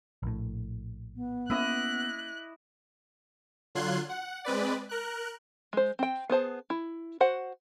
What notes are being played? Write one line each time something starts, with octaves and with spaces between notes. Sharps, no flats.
A#1 A2
B3
A#3 C#4 E4 D#5 D6 F#6
D3 F#3 F4 C6 F#6 G#6
F#5
G#3 C4 B4 D5
A#4 F#6
G#3 C5
C4 G5
B3 G#4 C5 A5
E4
F#4 C5 F#5